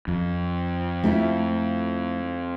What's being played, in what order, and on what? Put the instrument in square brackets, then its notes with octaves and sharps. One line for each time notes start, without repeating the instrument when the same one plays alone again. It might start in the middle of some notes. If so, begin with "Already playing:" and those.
[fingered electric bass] F2
[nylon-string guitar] A3 E4 F4